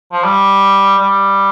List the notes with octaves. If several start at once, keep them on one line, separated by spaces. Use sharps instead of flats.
F3
G3
G3